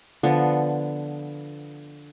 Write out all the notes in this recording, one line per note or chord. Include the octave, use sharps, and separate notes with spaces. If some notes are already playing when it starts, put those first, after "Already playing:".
D3 F3 B3